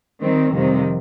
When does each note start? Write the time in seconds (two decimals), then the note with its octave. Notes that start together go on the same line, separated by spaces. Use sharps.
0.22 D#3 G3 C4
0.52 F2 C3 D#3 G3